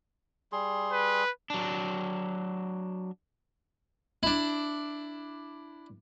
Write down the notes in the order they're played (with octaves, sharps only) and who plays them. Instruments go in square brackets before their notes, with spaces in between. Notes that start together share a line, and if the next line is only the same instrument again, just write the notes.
[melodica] G3 G#4 C6
[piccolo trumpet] B4
[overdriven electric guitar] F#3 D4
[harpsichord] D4 E4